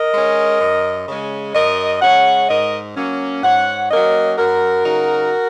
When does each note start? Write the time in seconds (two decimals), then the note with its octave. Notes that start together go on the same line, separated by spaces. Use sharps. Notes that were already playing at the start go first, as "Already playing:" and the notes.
Already playing: A#4 D#5
0.13 G#3 C#4
0.60 F#2
1.08 C#3 G#3 C#4
1.55 F#2 A#4 D#5
2.02 C#3 G#3 C#4 C#5 F#5
2.49 G#2 A#4 D#5
2.96 F#3 A#3 C#4
3.43 G#2 C#5 F#5
3.91 F#3 A#3 C#4 A#4 D#5
4.38 F#2 F#4 A#4
4.85 C#3 F#3 D#4